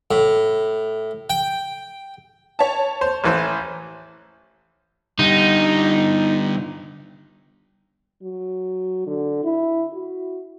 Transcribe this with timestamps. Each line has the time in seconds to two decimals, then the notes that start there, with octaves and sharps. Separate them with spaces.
0.11 A2
1.30 G5
2.59 C#5 A5
3.01 C5
3.24 A1 E3 C5
5.19 D3 G3 D#4
8.22 F#3
9.06 D3
9.44 E4
9.93 F#4